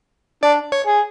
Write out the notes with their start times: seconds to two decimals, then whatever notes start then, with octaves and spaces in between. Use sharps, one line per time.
0.43 D4 D5
0.72 C#5
0.87 G#4